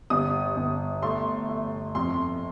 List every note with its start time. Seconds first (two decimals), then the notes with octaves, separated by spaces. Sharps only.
0.10 G1 D#6
0.57 G1
1.02 A3 C6
1.49 A3
1.95 F2 C6